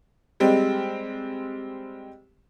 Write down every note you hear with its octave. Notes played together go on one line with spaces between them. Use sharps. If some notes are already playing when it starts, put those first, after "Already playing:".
G3 G#3 C4